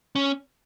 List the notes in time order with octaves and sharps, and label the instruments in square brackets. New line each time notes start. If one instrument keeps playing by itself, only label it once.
[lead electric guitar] C#4